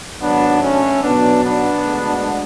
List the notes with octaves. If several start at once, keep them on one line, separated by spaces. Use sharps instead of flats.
G#1 G#2 F#3 B3 D4
A3 C#4
B1 B2 F#3 B3 D4
B3 D4
D2 D3 G#3